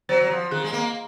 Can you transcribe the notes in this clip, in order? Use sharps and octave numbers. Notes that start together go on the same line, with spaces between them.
F#3 C5
F#3
F3
D#3 G#4
G#3
A#3